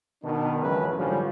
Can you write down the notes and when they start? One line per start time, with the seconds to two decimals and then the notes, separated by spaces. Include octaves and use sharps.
0.22 B2 D#3 D4
0.62 C#2 F#2 C#3 E3 F#3 B4
0.98 G#2 D3 F3 G3 C#4